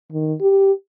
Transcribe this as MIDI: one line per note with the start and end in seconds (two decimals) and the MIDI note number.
0.13 0.34 51
0.41 0.72 67